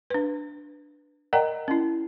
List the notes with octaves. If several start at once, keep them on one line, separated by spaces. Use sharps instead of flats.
D4 B4
A#4 D5 D#5 F#5 G5 A#5
C#4 E4